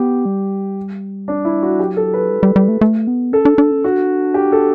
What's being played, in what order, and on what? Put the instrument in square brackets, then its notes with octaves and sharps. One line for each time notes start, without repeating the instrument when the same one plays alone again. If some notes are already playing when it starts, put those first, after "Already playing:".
Already playing: [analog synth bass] B3 [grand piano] G4
[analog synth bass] G3
[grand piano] D4
E4
F#4
[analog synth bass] F#3 [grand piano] G4
[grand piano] A4
B4
[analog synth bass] G3
G3
G3
A3
A3
B3
[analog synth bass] C#4 [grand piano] A4
[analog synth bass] D4
D4
C#4
[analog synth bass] D4 [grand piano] F#4
[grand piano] G4
A4